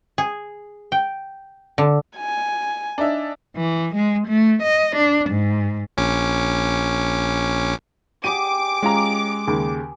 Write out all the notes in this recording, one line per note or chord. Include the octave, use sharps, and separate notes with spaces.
G#4
G5
D3
G#5
D4 D#4 E5
E3
G#3
A3
D#5
D4
G#2
A#1 C#4 D6
G4 G#4 D6 D#7
G#3 C#4 F4 A#5
D#2 C#3